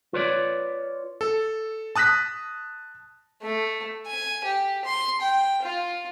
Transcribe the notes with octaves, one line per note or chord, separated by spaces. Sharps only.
F4 B4 C#5 D5
A4
A5 D#6 F#6 A#6 B6
A3
G#5
G4
C6
G5
F4